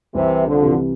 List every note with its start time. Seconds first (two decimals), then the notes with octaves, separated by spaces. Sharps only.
0.15 C2 C3 E3
0.46 D3 F3
0.63 C3 E3